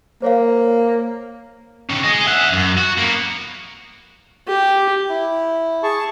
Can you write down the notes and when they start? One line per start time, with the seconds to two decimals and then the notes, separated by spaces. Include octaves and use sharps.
0.22 A#3 C5 C#5 F5
1.90 D#3 C#4
2.04 G#4 D#5
2.27 E5 F#5
2.53 F#2
2.77 F#4
2.98 A#3 B3
4.47 G4
5.09 E4
5.83 G#4 A5 C#6